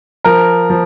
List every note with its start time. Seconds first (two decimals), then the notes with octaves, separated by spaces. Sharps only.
0.24 F3 A#4
0.70 F3